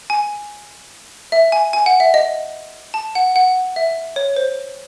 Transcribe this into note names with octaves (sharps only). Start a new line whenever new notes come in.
G#5
E5
G#5
G#5
F#5
E5
D#5
A5
F#5
F#5
E5
C#5
C5